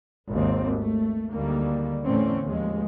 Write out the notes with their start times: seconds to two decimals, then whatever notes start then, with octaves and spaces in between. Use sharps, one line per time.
0.30 G#1 D#2 C4
0.77 A3
1.31 D2 D3 D#3 G3 A#3
2.04 E2 A2 D3 A3 C4 C#4
2.43 D#2 F3 G#3